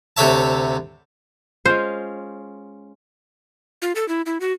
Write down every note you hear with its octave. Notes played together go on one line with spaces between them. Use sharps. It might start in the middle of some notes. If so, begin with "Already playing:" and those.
D2 C3 A4 C#5 E5 A5
G#3 C#4 F4 C5
F4
A4
E4
E4
F#4